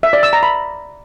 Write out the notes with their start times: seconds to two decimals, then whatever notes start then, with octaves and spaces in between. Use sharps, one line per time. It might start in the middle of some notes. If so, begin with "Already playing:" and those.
0.03 E5
0.13 D5
0.23 E6
0.33 A#5
0.43 B5